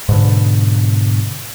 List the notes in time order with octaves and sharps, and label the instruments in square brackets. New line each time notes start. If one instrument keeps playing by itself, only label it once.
[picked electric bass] G#2 B2 D3